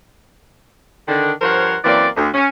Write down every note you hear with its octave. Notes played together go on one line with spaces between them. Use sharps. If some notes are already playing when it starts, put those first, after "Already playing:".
D3 D#3 D4
G2 F3 A#4 C5 C#5 F#5
F#2 E3 A#3 C4 D5
D2
C#4